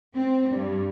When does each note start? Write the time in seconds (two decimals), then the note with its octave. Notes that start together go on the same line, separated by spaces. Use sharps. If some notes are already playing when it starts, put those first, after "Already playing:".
0.15 C4
0.50 G2